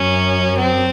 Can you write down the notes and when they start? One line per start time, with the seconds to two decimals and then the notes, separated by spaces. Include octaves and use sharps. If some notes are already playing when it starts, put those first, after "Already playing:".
Already playing: F#2 C#4
0.58 C4